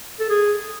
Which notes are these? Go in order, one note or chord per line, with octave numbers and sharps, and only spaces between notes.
A4
G#4